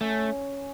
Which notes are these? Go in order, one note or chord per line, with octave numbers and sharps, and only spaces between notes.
A3 C#4